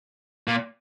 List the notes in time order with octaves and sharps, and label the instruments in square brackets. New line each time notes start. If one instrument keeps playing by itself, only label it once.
[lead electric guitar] A#2